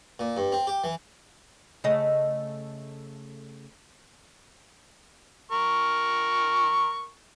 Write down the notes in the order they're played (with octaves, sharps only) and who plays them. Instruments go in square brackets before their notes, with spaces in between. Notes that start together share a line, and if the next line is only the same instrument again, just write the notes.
[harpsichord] A#2
G2
C4
G4
E3
[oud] C#3 A3 D#5
[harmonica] A#4 C#6